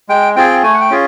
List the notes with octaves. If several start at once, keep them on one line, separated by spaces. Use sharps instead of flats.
G#3 G5
C4 F4 G#4 G5
A3 G#5
F#5
G5
C#4 F4 G#4